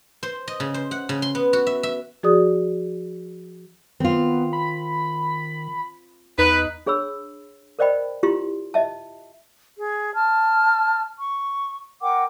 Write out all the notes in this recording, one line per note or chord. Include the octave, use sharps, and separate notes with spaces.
C5
D#5
C#3
C5
F#5
C#3
C6
B3
F#4
E5
E5
F3 F#4 G#4 D5 D#6
D#3 B3 C4 F4
B5
E2 D#4 B4
D4 G#4 C#5 B5 E6
A#4 C5 D5 D#5 G5 B5
E4 F4 G4 A#5 C6
D#5 E5 A5
G#4
A5 F6
C#6
A#4 F#5 G5 D6